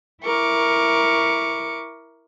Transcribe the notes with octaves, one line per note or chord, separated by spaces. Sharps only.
E4 A#4 C#6 D6